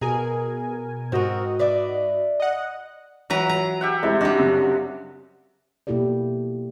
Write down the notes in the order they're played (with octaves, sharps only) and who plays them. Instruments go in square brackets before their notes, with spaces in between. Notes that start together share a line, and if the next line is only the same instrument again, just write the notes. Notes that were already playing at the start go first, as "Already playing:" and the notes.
[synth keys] B2 A#4 G#5 [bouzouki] G#4
[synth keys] G#2 F#4 D#5 [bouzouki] C4 A#4
[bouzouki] B4 D5 E5
[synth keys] D#5 F#5
[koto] E3 B4 A#5 [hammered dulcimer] F#3
[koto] A#5
[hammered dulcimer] G4 E5 F#5
[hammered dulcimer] C3 [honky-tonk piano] G#3 A3 E4
[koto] G3 D4 [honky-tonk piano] D#4 [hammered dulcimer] F#4
[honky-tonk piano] F#2 C#3
[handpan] B2 A#3 E4 G4 A4 D5